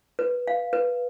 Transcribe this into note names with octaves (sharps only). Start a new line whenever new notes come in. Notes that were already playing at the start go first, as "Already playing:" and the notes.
B4
F5
B4